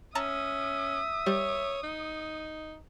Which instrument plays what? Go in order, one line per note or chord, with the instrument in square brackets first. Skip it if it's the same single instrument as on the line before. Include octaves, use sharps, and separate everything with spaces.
[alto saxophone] C#4 [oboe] E5 [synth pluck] A5 A#5 [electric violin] D#6
[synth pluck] G3 [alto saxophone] C#5
[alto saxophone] D#4